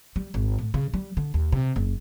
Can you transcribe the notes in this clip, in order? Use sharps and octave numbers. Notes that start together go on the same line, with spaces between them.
G3
G#1
A2
C#3
G3
D3
D#2
C3
F#1